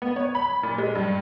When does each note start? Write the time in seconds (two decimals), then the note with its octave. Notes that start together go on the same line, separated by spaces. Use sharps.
0.02 B3
0.16 C#5
0.35 B5
0.63 A#2
0.78 G#3
0.95 G2